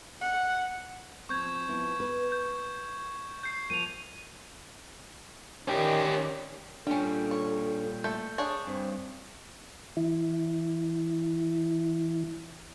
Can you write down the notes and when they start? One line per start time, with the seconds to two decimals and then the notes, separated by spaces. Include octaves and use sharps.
0.21 F#5
1.29 F3 C4 C#6 G6 G#6
1.68 F3 B3 E4
2.00 B4
2.32 G6
3.43 G6 C7
3.70 F3 A#3 D#7 F7
5.68 D#3 C#4 G4 D5
6.87 A#2 G3 C#4 D4 A4 G5
7.31 C#5
8.04 A3 G6
8.38 D4 G#4 C#5
8.67 G2 C4
9.97 E3 E4